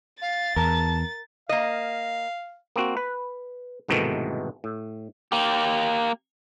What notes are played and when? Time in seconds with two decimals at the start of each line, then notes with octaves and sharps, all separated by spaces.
0.22 F5 A6
0.56 E2 A#4 A5
1.49 A#3 D#5 F5
2.76 A#3 C4 F#4
2.97 B4
3.88 C2 G#2 B2 D#3 E3 A3
4.64 A2
5.32 A#3 G4